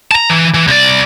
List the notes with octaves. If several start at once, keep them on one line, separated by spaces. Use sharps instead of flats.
A5 A#5
E3
E3
C2 D5